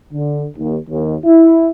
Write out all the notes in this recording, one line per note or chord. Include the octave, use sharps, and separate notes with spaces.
D3
D#2
D#2
E4